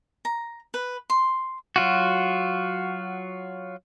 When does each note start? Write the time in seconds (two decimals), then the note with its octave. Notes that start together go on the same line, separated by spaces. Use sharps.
0.25 A#5
0.74 B4
1.10 C6
1.76 F#3 F4 F#4